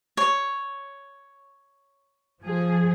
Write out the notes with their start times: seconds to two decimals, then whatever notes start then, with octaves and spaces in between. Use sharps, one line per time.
0.17 C#5
2.43 F3 G#4